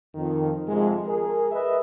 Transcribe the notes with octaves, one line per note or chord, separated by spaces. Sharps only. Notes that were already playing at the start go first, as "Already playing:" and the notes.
F2 D#3
F2 C3 G#3
G#4 A#4
B4 D#5 E5